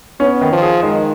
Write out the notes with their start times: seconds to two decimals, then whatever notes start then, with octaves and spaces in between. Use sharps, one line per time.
0.20 B3 C#4
0.41 D#3
0.52 F3
0.62 G#4
0.83 D#3 G#3